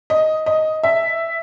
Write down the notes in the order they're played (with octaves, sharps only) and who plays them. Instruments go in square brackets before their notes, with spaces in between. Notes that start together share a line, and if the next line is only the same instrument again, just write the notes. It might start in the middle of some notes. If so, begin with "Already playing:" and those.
[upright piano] D#5
D#5
E5